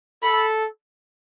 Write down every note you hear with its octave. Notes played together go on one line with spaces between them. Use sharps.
A4 B5